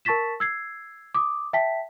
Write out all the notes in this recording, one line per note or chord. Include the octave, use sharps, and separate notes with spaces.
A#4 A5 C#6 A6 B6 E7
E6 G#6 C7
D6 D#6
E5 G5 A5 B6